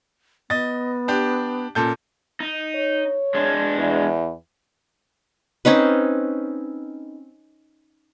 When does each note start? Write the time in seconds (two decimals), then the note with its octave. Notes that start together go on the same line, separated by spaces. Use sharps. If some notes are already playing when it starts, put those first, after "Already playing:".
0.50 B3 D#5 A6
1.08 D4 G4
1.75 A#2 C#4 A4 G6
2.40 D#4
2.75 C#5
3.34 G#3 D4
3.79 E2
5.65 C4 C#4 D#4 B4